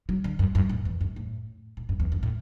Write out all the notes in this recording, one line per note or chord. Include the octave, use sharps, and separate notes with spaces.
F#3
D3
F#2
F#2
A2
E2
F#2
A2
A2
F#2
E2
F#2
A2